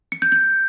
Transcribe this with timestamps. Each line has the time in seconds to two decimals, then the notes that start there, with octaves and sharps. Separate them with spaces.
0.12 C#7
0.22 G6
0.32 G6